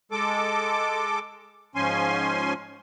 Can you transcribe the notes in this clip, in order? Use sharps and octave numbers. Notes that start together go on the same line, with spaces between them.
G#3 A4 D6
G#2 F3 C#4 G#5 C6